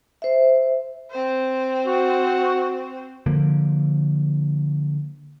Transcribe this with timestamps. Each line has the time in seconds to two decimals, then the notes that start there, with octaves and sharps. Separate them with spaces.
0.22 C5 E5
1.11 C4 C5
1.84 F#4
3.26 D3 F3 A#3